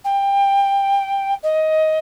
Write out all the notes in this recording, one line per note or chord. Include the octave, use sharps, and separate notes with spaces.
G5
D#5